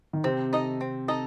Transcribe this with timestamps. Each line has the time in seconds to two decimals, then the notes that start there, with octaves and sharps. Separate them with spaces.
0.13 D#3
0.24 C3 C4
0.53 D#4 A4 D#5
0.81 C4
1.08 D#4 A4 D#5